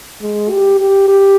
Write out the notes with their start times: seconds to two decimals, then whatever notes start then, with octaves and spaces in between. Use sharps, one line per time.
0.22 G#3
0.51 G4
0.80 G4
1.08 G4